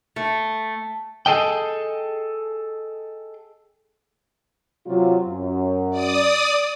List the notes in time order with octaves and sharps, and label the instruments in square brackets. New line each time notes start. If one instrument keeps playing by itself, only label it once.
[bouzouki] A3
[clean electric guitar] G#4 A4 D#5 G5
[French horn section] C3 F#3 F4
F#2
[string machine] D5 D#6